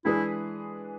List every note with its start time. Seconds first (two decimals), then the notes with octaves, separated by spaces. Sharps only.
0.05 E3 G#3 D4 E4 G#4 B4